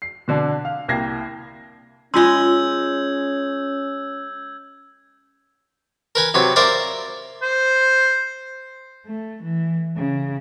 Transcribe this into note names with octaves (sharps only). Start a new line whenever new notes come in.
C7
B2 D3 D4
F5
C2 A#3 G5 G#6 A#6 C7
G#3 C#4 F4 G#4 C6 E6 G6 G#6
A#4 B4 G#5
C3 F#3 B4
A#4 C5 D5 E5 F5 A#5
C5
A3
E3
C#3